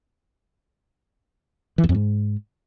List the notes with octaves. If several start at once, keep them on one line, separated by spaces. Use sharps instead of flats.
E3
E2
F2
G#2